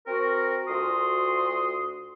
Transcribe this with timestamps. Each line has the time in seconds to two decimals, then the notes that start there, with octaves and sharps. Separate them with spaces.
0.07 C4 F#4 A#4
0.68 D2 F4 F#4 C6 D#6